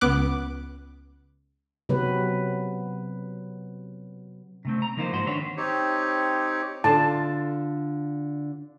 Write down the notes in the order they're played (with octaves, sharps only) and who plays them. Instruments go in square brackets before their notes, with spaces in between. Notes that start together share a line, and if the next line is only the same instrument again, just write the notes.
[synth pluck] C#2 B3 D6 F#6
[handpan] C3 F#3 B3 B4
[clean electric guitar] C3 A3 C4
A#5
F3 A#3 D#4 F4 C5
G#2 F#4 C5
D#3 C4 D4 B4 C#5
[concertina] C4 D#4 G4 C#5
[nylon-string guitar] D3 F4 [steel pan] A5